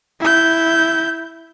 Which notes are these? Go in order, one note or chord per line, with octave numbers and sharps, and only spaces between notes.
E4 G6